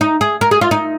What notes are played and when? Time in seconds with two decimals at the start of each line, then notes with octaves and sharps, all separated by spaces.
0.01 D#4
0.21 G#4
0.41 A#4
0.51 G#4
0.61 F4
0.71 D#4